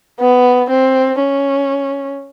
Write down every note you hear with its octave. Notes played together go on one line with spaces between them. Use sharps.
B3
C4
C#4